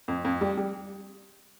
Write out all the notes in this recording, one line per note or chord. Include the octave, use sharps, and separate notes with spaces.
F2
F2
G3
G3